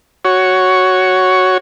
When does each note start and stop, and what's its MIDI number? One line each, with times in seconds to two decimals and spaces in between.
0.25 1.58 66
0.25 1.58 73